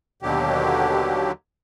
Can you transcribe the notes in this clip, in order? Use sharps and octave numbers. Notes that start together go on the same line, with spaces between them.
D#2 B2 D3 F#3 G4